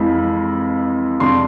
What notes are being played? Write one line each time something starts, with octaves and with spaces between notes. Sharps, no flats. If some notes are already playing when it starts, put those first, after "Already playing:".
Already playing: F2 E3 G#3 B5
F2 C3 G#3 D4 C6